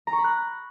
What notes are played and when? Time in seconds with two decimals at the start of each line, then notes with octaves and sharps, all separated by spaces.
0.07 A#5
0.13 C#6
0.18 B5
0.24 F#6